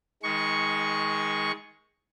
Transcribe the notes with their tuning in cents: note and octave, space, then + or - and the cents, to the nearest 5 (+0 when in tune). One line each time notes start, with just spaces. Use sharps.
D#3 +30 G#3 +0 C#6 +0